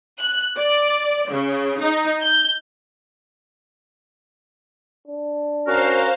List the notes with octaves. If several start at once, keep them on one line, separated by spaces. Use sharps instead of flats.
F#6
D5
C#3
D#4
G6
D4
C#4 F#4 A#4 C5 F5